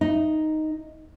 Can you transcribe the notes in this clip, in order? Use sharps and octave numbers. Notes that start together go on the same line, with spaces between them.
D#4